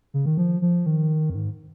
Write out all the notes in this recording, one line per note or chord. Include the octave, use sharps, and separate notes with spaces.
C#3
D#3
F3
F3
D#3
F2
G#2